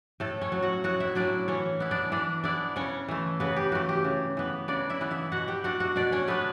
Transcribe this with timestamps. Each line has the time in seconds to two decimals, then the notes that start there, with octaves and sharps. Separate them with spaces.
0.20 A2 A3 A4
0.41 C#4 C#5
0.52 F#3 C#4
0.62 F#4 F#5
0.84 A2 F#4 F#5
1.00 E4 E5
1.15 F#3 C#4 D4 D5
1.48 E3 C#4 C#5
1.80 B3 E4
1.91 D4 D5
2.12 E3 D4 D5
2.44 B3 D4 E4 D5
2.76 C#3 C#4 C#5
3.08 E3 A3
3.40 C#3 B3 B4
3.56 G4
3.72 E3 A3 F#4
3.89 G4
4.04 C#3
4.37 E3 B3
4.68 C#3 D4 D5
4.90 E4 E5
5.01 E3 B3
5.11 E4 E5
5.32 B2 F#4 F#5
5.48 G4 G5
5.64 A3 D4 F#4 F#5
5.80 F#4 F#5
5.96 B2 D4 D5
6.12 C#4 C#5
6.28 A3 B3 D4 B4